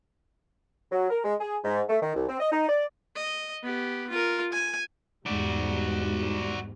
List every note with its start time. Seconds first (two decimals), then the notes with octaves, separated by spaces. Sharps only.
0.92 F#3
1.10 A#4
1.25 G#3
1.40 G#4
1.64 G#2
1.89 A3
2.02 D#3
2.15 C2
2.29 C4
2.40 D#5
2.52 D#4
2.69 D5
3.16 D#5
3.63 B3 G4
4.10 F4 A#4
4.53 G#5
5.26 E2 G#2 G3 F#4 D5